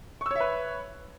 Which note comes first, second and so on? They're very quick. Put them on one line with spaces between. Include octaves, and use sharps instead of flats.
C#6 E6 C#5 E5 B4